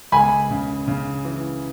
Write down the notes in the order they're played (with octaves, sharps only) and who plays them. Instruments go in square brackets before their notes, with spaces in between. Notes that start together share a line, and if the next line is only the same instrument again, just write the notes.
[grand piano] C#2 [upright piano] G#5 B5
[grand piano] C#3
C#3
E3